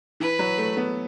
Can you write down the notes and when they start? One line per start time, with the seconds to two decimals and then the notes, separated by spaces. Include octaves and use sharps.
0.20 E3 B4
0.39 F#3
0.58 A3
0.77 B3